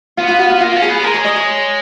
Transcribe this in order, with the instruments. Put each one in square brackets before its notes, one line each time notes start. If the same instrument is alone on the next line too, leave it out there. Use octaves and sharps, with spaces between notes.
[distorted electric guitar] B3 [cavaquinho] F4
[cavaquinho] F4
F#4
F4
[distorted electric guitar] A#3 [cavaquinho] F4
[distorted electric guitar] C#4
[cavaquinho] G#4
[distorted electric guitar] B3
F#3
[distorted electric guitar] G#3 [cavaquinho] A#4
[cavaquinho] C#5
D#5
C#5